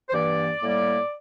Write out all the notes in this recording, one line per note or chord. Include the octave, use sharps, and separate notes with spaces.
C5
G2 E3 A#3 D5
A2 G3 A#3